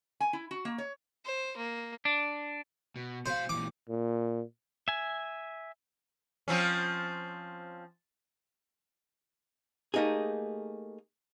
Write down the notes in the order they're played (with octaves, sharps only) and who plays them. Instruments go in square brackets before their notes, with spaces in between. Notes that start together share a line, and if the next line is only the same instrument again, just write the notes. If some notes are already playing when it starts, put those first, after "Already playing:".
[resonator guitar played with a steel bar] G#5
E4
F#4
A#3
C#5
[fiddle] C5
A#3
[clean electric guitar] D4
[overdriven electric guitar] B2
[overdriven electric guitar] B2 F5 [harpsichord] C5
[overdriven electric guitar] A#2 E3 [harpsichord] D6
[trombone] A#2
[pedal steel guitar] E5 G#5
[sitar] F3 C4 C#4
[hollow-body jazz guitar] A3 A#3 D#4 G4 G#4